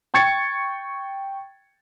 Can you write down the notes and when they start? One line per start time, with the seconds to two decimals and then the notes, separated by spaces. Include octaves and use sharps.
0.14 G5 C#6 G#6 A6 C#7